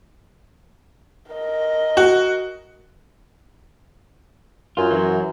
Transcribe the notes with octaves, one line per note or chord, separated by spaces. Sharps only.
A#4 D#5
F#4
F#2 F4
E3 F#3